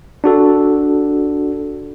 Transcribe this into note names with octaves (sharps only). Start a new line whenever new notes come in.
D4 F#4 A4